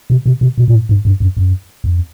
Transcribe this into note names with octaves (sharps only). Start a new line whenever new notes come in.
C3
C3
C3
B2
A#2
A2
G#2
G2
F#2
F#2
F2